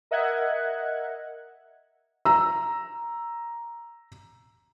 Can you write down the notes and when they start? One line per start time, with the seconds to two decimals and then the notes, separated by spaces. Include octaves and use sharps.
0.11 A#4 D#5 E5 F#5 F#6 G#6
2.25 A#5 E6